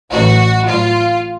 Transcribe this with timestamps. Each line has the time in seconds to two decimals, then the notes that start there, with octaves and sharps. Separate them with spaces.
0.12 A1 A2 F#3 F#4
0.67 A1 A2 F#3 F4